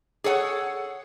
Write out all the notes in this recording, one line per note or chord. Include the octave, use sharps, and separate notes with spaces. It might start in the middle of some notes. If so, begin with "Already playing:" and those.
G#4 A4 C#5 F#5